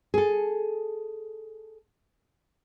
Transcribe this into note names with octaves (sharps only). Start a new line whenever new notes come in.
G#4 A4